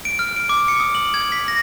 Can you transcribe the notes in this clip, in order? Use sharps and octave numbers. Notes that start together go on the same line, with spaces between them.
D7
F6
D7
D6
C#7
D#6
F#7
G#6
B6
A#6